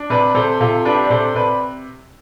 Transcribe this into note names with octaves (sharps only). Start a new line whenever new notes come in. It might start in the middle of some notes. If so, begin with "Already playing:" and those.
Already playing: D4
C3 B4 D5
C3 A4 C5
C3 F4 A4
D4 G4 B4
D5
C3 A4 C5
C3 B4 D5